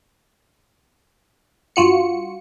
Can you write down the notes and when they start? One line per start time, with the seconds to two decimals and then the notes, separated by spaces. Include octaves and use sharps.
1.76 G2 F4 F#4 C#7